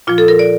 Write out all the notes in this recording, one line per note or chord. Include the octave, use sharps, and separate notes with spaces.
A#2 F3 F4
A4
A#4
D5